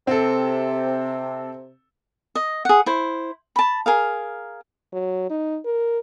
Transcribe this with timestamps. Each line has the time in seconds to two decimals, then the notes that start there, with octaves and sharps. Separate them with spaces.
0.07 C3 C4 A4
2.35 D#5
2.65 G#4 F#5
2.86 E4 C5
3.56 A5 B5
3.86 G#4 A#4 F5
4.93 F#3
5.30 D#4
5.65 A#4